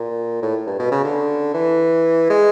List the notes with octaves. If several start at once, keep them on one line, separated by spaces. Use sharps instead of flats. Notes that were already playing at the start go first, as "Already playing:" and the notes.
Already playing: A#2
A2
G2
B2
C#3
D3
E3
G#3